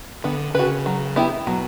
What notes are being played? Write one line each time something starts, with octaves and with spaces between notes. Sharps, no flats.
D3 B3
C#3 F#4 B4
F#3
B3 E4 G4
B2 F#3